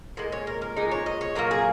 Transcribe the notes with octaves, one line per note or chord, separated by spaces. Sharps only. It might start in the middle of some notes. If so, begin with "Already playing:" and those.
A#2 G#3 D#5
C#5
A#4
A#4
A#2 G#3 D#4
C#5
D#5
C#5
A#2 F#3 A#3 A#4
G#4